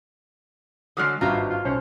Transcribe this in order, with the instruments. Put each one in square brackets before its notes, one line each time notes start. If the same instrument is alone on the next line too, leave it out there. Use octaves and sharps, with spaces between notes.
[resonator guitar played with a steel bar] D3 F#3 G#3 [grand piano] D#6 F6 C7
[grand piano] G#1 G2 F#4 [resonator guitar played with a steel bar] G3 E5 A#5 [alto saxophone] F4
[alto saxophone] F4
[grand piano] B1 C5 [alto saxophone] C#4